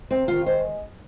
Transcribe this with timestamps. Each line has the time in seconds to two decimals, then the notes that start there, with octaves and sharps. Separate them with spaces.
0.11 C3 C4
0.28 D#3 F4
0.46 G#3 C5